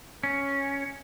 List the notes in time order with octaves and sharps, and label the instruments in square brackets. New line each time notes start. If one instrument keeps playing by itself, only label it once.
[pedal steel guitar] C#4